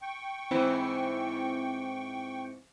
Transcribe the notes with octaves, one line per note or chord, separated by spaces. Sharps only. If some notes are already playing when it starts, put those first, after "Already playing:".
G5 C#6
G#2 E3 C4 E4